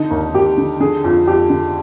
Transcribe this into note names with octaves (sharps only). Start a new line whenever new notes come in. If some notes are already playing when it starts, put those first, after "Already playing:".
Already playing: D3 D#4
D#2
D#2 G4
D3
D3 G#4
F2
F2 G4
D3